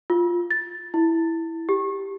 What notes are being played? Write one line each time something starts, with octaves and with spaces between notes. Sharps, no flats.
F4
A6
E4
G4